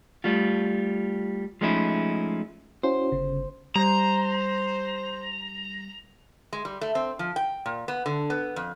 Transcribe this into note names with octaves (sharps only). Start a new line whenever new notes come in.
G3 A3 F4
F3 G#3 A3 C#4 D#4 E4
C#4 E4 F#4 C5
G1 C#3
G3 C5 A#5
G#3
G3
A3
C4
F3
G5
A#2
B3
D3
B3
F2